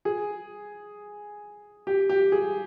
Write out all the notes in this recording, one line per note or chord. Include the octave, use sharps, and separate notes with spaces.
G#4
G4
G4
G#4